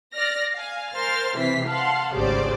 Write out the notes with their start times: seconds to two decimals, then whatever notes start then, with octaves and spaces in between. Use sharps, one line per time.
0.13 D5 F6 A#6
0.55 F5 G#5
0.92 A#4 C5 C6 F6 A6
1.37 C3 E3 C4 B6 C7
1.67 F5 F#5 A5 C6
2.14 G#1 D2 C#3 G4 C5 D5